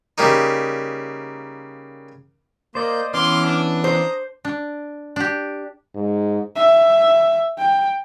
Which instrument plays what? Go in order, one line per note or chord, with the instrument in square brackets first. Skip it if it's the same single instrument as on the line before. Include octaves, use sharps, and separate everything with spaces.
[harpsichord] C#3 G3 A#3 D#4
[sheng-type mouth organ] A#3 G6 [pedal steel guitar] C5 D5 D#5
[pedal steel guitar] E3 B3 C#4 [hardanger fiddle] C6 [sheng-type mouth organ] D6 F6
[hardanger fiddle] D4
[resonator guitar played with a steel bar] C5 [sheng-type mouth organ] A#5 D#6
[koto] D4
D4 G4
[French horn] G#2
[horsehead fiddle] E5
G5